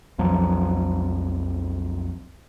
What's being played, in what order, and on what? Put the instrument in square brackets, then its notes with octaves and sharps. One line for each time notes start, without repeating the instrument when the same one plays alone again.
[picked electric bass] B1 F2 F3 F#3